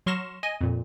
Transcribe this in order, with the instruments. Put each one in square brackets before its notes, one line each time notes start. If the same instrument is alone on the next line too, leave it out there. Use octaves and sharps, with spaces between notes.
[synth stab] F#3 C6 C#6 F6 A#6 E7
D#5 G#5 D#7
F2 A#2